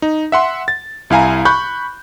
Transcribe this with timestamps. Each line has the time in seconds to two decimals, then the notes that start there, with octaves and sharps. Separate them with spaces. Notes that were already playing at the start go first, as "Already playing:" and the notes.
0.02 D#4
0.32 E5 F#5 C6
0.68 A6
1.10 C2 E4 F5 G#5 A#5
1.45 B5 C#6 F#6 G6